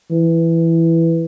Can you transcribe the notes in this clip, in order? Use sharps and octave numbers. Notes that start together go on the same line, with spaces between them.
E3